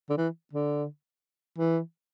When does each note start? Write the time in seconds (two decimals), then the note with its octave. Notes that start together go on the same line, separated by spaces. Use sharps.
0.10 D3
0.17 E3
0.53 D3
1.58 E3